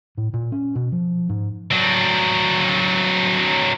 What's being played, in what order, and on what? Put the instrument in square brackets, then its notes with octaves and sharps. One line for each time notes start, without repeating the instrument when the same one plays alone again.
[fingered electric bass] A2
A#2
C#4
B2
F3
G#2
[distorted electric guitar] F#3 D4